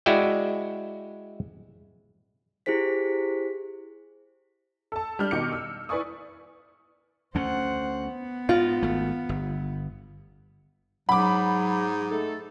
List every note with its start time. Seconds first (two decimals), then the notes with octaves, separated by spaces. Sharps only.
0.06 G#3 E4 F#4 D5 E5 G5
2.66 E4 G4 G#4 C5 B6
4.92 A4 A5
5.19 G3 D4 F6 G6
5.31 B2 D#3 D6 C#7
5.52 E6
5.89 E4 B4 D5 G#5 C#6 D#6
7.35 D2 A3 C#4 C5 F#5
8.06 B3
8.49 G#2 F4
8.83 G#1 A3
9.29 G1
11.09 G#2 F#3 F#5 B5 D6
12.11 A3 D#4 A4